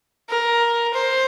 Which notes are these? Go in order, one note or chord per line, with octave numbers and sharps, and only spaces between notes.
A#4
C5